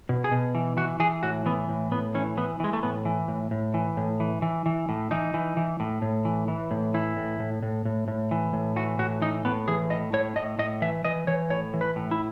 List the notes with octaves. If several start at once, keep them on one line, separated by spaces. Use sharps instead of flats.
B2
G#4
B2
E3
E3 F#4
E3 G#4
A2 F#4
E3 B3
A2
A2 B3
E3 C#4
E3 B3
E3 G#3
A3
A2 B3
E3
A2
A2
E3
A2
E3
E3
E3
A2
E3 D#4
E3
E3
A2
A2
E3
E3
A2
E3 E4
A2
A2
A2
A2
A2
E3
A2
E3 F#4
A2 F#4
E3 D#4
A2 B3
E3 G#4
A2 D#5
A2 C#5
A2 D#5
A2 D#5
E3 E5
E3 D#5
E3 C#5
A2 C#5
E3
B4
A2
E4